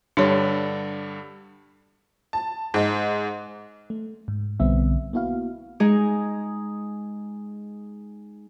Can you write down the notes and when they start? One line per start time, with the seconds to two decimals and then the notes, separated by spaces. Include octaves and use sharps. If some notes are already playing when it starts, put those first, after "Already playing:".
0.17 G2 D3 G3 D4 C#5
2.33 A5
2.74 G#2
3.90 A3
4.28 G#2
4.60 B1 D3 G3 B3 C4 E5
5.13 A#3 B3 E4 F#4 F5
5.80 G#3 D#4 G#4